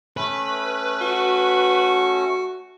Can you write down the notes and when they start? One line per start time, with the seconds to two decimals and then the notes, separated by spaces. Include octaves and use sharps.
0.17 A3 C#4 B4
1.01 F#4